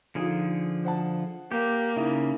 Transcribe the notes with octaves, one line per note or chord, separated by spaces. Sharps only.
D3 F3 D#4 F4 G#4
C5 F#5 A5
A#3 G4
C#3 D#4 E4